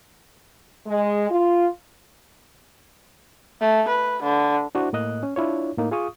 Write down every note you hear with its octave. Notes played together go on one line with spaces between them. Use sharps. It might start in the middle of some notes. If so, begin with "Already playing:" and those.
G#3
F4
A3
B4
D3
D4 E4 F#4 C5
A2 A#3 D#5 F#6
C#4
D4 E4 F4 C#5
A2 A#3 D#4
F4 G#4 F5 C#6 D#6